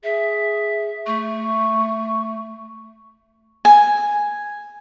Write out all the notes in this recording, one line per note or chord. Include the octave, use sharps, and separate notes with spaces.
G#4 E5
A3 C#6
G#5